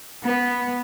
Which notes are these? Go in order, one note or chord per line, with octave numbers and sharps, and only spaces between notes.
B3